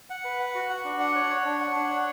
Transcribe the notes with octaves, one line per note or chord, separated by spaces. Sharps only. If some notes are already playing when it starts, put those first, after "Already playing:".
F#5
B4
F#5
F#4
F#5
D4
F#5
C#5
C#5
D4
F#5
D4
C#5